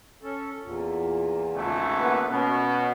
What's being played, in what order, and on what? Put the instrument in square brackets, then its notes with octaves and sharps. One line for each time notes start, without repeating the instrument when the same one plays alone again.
[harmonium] C#4 A4
E2 A#2
[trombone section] G#1 C#2 A3
[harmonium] A#3 B3 B4
[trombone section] B2 [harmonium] C#4